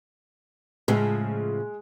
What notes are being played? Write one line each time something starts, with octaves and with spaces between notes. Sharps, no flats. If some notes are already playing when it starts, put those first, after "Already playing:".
A2 C#3 F3 G#3